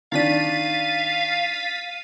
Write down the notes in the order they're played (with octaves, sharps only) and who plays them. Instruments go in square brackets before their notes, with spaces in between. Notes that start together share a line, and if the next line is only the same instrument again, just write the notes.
[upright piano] D#3 D4 [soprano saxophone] F5 [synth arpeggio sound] A6 B6 D#7